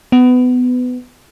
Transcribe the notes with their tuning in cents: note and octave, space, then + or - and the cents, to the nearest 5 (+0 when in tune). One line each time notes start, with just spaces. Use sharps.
B3 +20